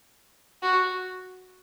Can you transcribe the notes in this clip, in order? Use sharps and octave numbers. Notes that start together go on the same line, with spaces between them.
F#4